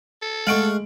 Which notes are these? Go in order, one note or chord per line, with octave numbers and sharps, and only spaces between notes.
A4
G#3 A3 F5 F#5 C#6 D7 F#7